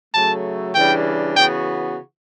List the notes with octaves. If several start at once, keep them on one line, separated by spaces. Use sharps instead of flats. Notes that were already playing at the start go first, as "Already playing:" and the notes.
C#3 F#3 A3 A5
C#3 E3 G3 D4 G5
C#3 E3 B3 F#4 G5